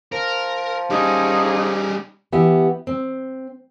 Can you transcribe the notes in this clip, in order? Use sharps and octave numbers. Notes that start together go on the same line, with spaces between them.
F3 A#4
G3 C#4 D#4 G#4
E3 B3 G4 E5
C4